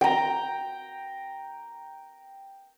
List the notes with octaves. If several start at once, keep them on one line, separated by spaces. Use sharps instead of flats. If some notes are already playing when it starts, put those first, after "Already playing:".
G5 A#5